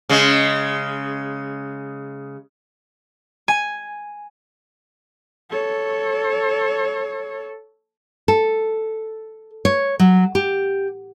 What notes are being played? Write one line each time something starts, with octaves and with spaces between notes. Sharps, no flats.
C#3 G#3
G#5
A4 C#5
A4
C#5
F#3
G4